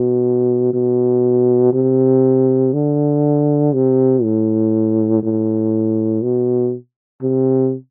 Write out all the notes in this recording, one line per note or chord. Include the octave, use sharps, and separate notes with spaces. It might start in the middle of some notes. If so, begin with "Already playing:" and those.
Already playing: B2
B2
C3
D3
C3
A2
A2
B2
C3